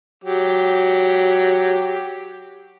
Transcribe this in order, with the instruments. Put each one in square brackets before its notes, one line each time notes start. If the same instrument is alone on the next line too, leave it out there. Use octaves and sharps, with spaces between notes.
[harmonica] F#3 G4